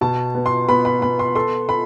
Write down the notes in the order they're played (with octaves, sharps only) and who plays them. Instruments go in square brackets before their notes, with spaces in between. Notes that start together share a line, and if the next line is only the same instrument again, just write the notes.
[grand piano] B2 [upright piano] A5
[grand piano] B3
[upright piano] C6
[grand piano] B3 [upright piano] B5
[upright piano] B5
[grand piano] B3 [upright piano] B5
[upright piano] C6
[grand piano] A4 [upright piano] C6
[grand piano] A4 [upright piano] B5